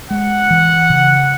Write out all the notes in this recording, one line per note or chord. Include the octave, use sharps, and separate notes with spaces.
G#3 F#5
E3
C#3